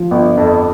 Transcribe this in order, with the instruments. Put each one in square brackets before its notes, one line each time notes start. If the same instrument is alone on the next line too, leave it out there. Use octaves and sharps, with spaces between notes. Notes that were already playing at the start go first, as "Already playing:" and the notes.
Already playing: [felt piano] F3
[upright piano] G1
F2